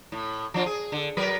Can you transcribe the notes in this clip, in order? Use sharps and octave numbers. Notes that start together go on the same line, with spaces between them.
A2
F3 D4 F4
G#4
D3
F#3 A#4 B4